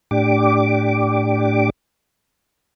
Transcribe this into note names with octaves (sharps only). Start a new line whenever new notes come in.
A2 D4 G4 D6